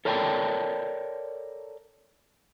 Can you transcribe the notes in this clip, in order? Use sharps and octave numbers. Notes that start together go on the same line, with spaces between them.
A4 A#4 C#5 D5 G5 A5